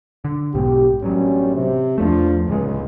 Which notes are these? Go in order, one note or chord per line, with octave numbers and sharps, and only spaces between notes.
D3
B1 G#2 B2 G4
A1 F#2 F#3 G3 C#4
C3
E2 F3 A3 D4
D1 C#2 G#3